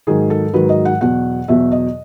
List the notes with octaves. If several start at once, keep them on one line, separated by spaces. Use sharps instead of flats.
G#2 D#3 F#3 G#4
A4
G#2 D#3 F#3 B4
D#5
F#5
E2 B2 F#3 F#5
E2 B2 F#3 E5
D#5